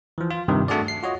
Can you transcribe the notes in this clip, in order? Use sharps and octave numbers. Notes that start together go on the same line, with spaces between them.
E3 F3
F4
G2 C3 D#3
A3 D4 F#4 G#4 D5
C7
F4 F#4 C#5 D#5